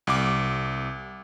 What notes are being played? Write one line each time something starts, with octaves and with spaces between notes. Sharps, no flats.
C2 D6